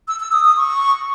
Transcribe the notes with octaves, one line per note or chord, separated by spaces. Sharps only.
E6
E6
D#6
D#6
C#6